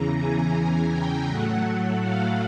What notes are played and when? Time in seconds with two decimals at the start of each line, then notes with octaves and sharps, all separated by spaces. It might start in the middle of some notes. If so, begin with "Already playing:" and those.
Already playing: E2 C#3 E3 A#5
0.17 G#5
0.91 G5
1.28 A2 F#3 A3 F#5
2.02 F5